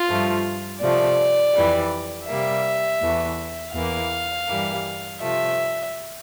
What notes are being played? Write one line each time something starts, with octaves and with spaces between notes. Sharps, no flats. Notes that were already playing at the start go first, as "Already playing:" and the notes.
Already playing: F4
G2 F3 A3
C3 F3 A3 D5
F2 E3 G3
C3 G3 A#3 E5
E2 E3 A3
E2 E3 A#3 F5
G2 E3 G3 A#3
C3 F3 A3 E5